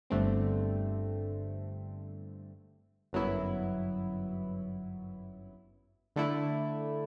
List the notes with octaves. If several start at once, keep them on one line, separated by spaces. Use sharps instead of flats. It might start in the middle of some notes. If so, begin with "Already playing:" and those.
G1 G2 D3 A3 C4
G1 F#2 F#3 B3 E4
D3 A3 E4